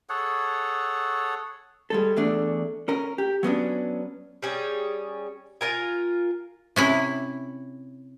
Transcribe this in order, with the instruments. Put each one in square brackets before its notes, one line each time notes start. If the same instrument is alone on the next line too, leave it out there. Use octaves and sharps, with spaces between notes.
[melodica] G#4 A4 C#5 F#5
[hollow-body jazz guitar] G3 G#3 A4
E2 A3 D4
C#4 A#4
G4
F#3 B3 C#4 D4
[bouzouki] G3 C#4 G#4
F4 A#4 G#5
[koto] C3 C#4 E4